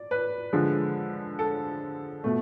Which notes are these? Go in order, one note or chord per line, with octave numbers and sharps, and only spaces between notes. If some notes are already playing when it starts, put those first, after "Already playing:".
Already playing: D5
B4
D3 F3 G#3
A4
B2 A3